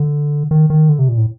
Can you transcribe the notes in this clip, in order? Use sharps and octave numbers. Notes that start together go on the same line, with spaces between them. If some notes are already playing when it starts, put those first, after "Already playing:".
Already playing: D3
D#3
D#3
D3
C3
A#2
A2